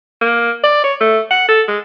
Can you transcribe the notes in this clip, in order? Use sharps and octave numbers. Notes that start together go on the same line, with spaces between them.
A#3
D5
C#5
A3
F#5
A4
G#3